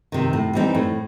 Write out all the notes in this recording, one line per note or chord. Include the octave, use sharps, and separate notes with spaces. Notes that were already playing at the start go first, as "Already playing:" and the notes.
C3 D#3
A2
E3 G3 C4 D#4
A2